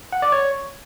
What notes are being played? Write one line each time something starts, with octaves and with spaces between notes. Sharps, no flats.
F#5
D5
C#5